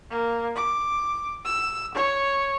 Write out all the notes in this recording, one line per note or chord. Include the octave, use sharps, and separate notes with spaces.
A#3
D6
E6
C#5